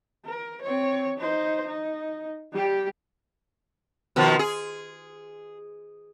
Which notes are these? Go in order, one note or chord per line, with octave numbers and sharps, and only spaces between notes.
A#4
C4 C#5
D#4 C5
D#4
G3 G4
B2 D#3 F3
G#4